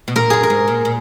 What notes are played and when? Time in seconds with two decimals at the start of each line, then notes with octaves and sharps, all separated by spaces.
0.08 B2
0.16 A#2 A#4
0.30 F#2 G#4
0.43 A#4
0.50 G#2
0.68 A#2
0.85 A#2